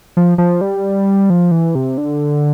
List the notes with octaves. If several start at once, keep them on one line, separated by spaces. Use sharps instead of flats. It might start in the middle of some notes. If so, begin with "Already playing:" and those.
F3
F3
G3
F3
E3
C3
D3